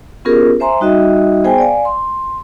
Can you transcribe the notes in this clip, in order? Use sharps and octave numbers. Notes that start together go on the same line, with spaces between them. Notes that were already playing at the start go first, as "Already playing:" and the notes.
B3 C#4 F4 G4 G#4 A#4
C5 E5 G#5 A#5 C6
G3 D#4 F#4 D#5 E5
B3 G#4 C5 G5 G#5
D5 F5 G#5
C6